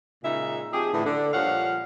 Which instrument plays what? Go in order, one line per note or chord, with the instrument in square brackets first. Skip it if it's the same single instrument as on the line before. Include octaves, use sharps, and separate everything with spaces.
[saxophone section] A#2 C#3 G#3 D#4 E5
F3 C4 G4 G#4
A2 D3 E3
D3
A#2 F3 G3 C#5 F5 F#5